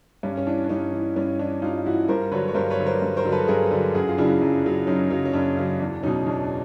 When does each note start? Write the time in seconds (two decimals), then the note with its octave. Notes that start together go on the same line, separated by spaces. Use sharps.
0.23 G2 C#4
0.37 C#4
0.46 E3 D4
0.64 D4
0.69 G2 C#4 D#4
0.93 E3
1.16 G2 C#4
1.39 E3 D4
1.62 G2 D#4 F4
1.86 E3 E4 F#4
2.08 G2 A#4 C5
2.32 D3 F#3 B4 C#5
2.48 C#5
2.55 G2 A#4 C5
2.70 B4 C#5
2.78 D3 F#3
2.86 A#4 C5
3.02 G2
3.17 A#4 C5
3.25 D3 F#3
3.32 A4 B4
3.48 G2 G#4 A#4
3.71 D3 F#3
3.94 F#2 F#4 G#4
4.08 F4
4.18 C#3 F#3 D4 E4
4.42 F#2
4.65 C#3 F#3
4.87 F#2 C#4 D#4
5.10 C#3 F#3
5.26 C#4
5.33 F#2 D4
5.57 C#3 F#3
5.80 E2 D4
6.03 B2 F#3 C#4 D#4
6.27 E2 D4
6.42 D4